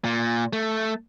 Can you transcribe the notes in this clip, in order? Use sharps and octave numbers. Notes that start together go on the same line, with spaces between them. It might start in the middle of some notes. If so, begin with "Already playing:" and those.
A#2
A3